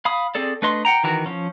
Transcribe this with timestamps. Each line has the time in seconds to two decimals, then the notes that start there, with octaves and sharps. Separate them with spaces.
0.05 F5 B5 D#6
0.35 C4 G#4 A4 D5
0.62 A3 D4 B4 D#5 C6
0.85 F#5 G5 A#5
1.04 D#3 E3 F#4 A#4
1.26 F3 C#4